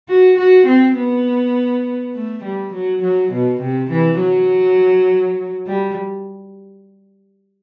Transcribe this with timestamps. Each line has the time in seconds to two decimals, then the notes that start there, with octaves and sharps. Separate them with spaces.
0.09 F#4
0.37 F#4
0.66 C4
0.96 B3
2.14 A3
2.44 G3
2.73 F#3
3.02 F#3
3.32 B2
3.61 C3
3.90 E3
4.20 F#3
5.67 G3